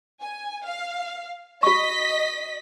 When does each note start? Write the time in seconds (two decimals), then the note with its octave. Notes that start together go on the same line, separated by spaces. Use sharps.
0.21 G#5
0.65 F5
1.63 F#4 D#5 C#6 B6